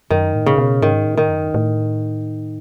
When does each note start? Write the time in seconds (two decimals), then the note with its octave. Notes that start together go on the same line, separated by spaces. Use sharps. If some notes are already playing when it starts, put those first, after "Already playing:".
0.10 F#2 D#3
0.35 A2
0.46 C#3
0.58 B2
0.82 G#2 D#3
1.06 A2
1.17 D#3
1.29 F#2
1.54 A2